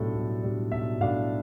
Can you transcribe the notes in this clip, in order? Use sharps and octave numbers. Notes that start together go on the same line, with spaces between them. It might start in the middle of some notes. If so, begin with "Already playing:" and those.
Already playing: B1 A2 G3 D4 A4
B1
A2 G3 D4
B1 E5
A2 G3 D4 F5